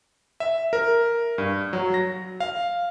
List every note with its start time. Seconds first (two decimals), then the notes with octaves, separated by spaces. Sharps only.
0.40 E5
0.73 A#4
1.38 G2
1.73 F#3
1.94 A#6
2.40 F5